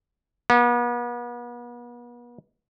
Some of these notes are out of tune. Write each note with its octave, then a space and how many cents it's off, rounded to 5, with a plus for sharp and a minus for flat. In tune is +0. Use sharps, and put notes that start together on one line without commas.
B3 -40